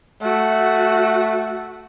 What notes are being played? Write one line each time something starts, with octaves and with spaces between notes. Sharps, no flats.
A3 F#4